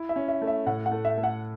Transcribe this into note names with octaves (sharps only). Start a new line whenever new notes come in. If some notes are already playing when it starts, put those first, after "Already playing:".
Already playing: E4
E5
C#4
E5
A3
E5
A2 F#5
F#5
A3
E5
A3
F#5